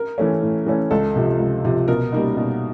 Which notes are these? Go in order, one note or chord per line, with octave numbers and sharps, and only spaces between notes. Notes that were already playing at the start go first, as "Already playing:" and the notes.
Already playing: A#4
E3 A3 C#4
A2
E3 A3 C#4
C#2 A4
C3 F3
C#2
C3 F3
B2 A#4
G3 A#3 D#4
B2